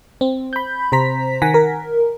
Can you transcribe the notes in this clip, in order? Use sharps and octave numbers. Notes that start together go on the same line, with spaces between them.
C4
B5 G6
C3 C5 A#5 B6
D#3 F#5 G#5 A#6 B6
A#4